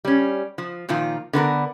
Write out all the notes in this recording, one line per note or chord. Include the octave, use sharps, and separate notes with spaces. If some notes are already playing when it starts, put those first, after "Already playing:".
G3 C#4
F3
A#2 D#3 F3 F4
D3 B3 A4 A#4